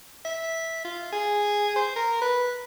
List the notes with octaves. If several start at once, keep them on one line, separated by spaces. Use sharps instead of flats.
E5
F4
G#4
C5
A#4
B4